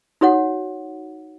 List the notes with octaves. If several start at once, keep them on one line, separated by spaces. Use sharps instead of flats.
D#4 F#4 C#5 F#5